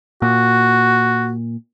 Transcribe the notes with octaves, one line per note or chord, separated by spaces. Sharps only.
A#2 F#4